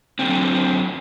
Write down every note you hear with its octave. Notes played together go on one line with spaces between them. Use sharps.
F#2 A#2 D3 C4